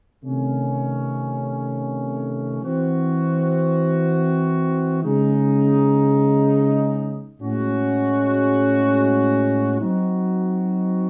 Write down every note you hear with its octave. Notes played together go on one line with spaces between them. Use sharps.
C3 D#3 A3 C#4
E3 C4 F#4
C#3 G#3 D#4
A2 G#3 C#4 F#4
F#3 C4 D#4 F#4